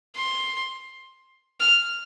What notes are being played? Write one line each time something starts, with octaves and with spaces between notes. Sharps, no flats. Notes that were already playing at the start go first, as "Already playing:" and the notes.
C6
F6